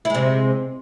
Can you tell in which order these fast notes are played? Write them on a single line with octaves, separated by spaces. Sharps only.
E4 G#3 C3